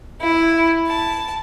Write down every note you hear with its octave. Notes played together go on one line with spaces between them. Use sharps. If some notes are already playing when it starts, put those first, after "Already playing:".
E4
A5